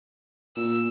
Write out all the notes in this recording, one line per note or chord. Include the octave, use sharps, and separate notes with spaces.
A#2 E6